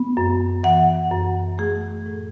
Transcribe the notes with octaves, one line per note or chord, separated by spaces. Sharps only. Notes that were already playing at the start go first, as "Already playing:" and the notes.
Already playing: B3
F#2
E3 F#5
F#2
A3 G#4
A2